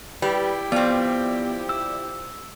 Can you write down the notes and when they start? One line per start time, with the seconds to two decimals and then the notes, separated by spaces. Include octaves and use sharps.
0.22 G3 E4 G4 B4
0.72 F3 B3 C4 D5
1.69 E6